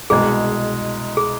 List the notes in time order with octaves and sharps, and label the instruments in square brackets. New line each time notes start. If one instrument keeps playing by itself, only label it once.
[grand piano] C2 B2 G#3 [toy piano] G#4
[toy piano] G#4